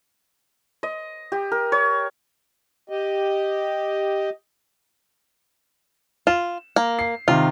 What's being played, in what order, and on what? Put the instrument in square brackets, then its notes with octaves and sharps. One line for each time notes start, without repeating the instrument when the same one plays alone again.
[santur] D#5
G4
A#4
C#5
[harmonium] G4 D#5
[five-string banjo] F4 [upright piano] E7
[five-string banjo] A#3
[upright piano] C7
[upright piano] C3 D#3 [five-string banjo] F4